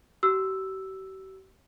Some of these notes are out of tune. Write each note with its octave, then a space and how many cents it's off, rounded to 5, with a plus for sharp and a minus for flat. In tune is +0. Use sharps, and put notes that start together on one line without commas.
G4 -45 E6 +0